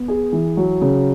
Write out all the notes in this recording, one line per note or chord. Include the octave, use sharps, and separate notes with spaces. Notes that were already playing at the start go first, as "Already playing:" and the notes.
Already playing: B3
G#4
E3
F#3
C#3